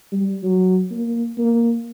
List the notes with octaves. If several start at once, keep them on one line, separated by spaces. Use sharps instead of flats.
G3
F#3
A#3
A#3